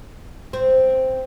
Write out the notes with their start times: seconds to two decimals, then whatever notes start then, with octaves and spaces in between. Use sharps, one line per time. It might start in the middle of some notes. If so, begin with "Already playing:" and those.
0.53 C4